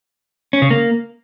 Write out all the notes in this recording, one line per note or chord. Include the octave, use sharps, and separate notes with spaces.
C#4
C#3
A#3